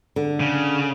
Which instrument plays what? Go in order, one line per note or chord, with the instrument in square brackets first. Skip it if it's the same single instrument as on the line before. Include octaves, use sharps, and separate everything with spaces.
[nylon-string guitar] D3
[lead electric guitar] C#3